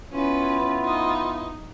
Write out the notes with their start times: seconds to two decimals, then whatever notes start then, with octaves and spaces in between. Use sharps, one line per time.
0.12 B3 C#4 E4 F4 B4
0.85 D#4